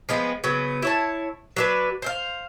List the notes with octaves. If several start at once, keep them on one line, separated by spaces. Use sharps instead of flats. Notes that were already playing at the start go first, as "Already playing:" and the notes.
F3 G#3 B3 C4
C#3 F#3 B3
E4 C#5 A5
F#3 D4 B4
C5 E5 F5